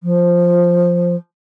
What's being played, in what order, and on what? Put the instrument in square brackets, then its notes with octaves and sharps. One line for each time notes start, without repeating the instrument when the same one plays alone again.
[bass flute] F3